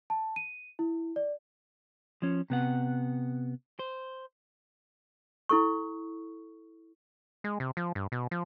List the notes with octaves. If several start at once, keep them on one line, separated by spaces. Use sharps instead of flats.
A5
D#7
E4
D5
F3 C#4
C3 B3 F#5
C5
E4 A4 C#6
G#3
C3
F3
G2
B2
F3